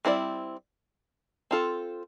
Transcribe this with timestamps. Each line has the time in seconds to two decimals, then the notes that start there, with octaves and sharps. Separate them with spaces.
0.05 G3 C4 E4 A#4 D5
1.51 C4 F4 A4